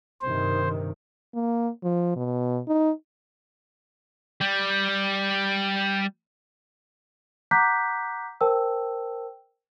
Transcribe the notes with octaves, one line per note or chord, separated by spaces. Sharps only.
G2 C3 D#3 C5
A#3
F3
B2
D#4
G3 G4
F#5 A#5 D6 F#6 G6 B6
A#4 C5 G5 A5 E6